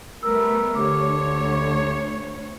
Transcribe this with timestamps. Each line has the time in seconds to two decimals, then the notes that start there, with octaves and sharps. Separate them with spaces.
0.23 G3 A3 B3 A#4 E6
0.75 D2 D3 G4 C#5 D6